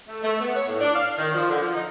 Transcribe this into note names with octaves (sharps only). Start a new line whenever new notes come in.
A3
A3
B3
C#5
A2
D4
F5
D#3
F3
D3
F3
D#4